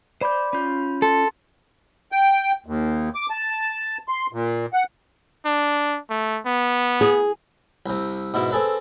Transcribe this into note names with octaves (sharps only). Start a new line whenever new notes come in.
C5 D5 B5 D6 G6
C#4 F4 B5 G6
A4 C6
G5
D#2
D6
A5
C6
A#2
F#5
D4
A3
B3
G#4
C2 C3
G#2 B2 E4
C4 G#4 A4 B4